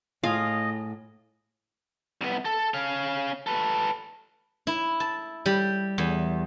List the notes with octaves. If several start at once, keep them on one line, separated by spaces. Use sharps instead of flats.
A2 F4 G#4 D#5 F5
C2 B3
A4
C#4 F5
A4 B4
E4
A5
G3
E2